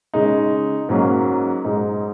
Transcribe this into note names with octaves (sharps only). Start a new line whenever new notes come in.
C#3 G#3 D#4
G#2 F#3 A#3 C#4
G#2 G#3 D#4